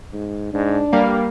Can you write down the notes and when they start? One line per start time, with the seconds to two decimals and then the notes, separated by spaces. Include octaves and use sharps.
0.12 G#2
0.54 G#2 D4
0.93 G2 G3 A#3 F5